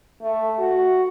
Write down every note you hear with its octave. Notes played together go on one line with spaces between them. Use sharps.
A3
F#4